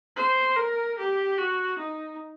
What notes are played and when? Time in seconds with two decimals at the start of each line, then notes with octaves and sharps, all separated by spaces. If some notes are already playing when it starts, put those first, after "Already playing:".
0.17 C5
0.57 A#4
0.99 G4
1.38 F#4
1.79 D#4